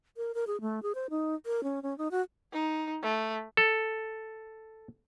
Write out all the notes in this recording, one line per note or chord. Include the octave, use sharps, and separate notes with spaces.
A#4
A#4
G#4
A3
G#4
C5
D#4
A#4
C#4
C#4
D#4
F#4
D#4
A3
A4